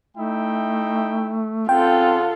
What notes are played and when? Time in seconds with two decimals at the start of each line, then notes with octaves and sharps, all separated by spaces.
0.17 A3 D#4 E4 G5
1.69 C#3 C4 F4 A4 F#5 G5 C6